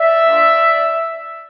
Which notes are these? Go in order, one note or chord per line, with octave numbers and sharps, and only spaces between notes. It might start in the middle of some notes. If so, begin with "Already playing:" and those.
Already playing: D5 E5
A#3 D4 F4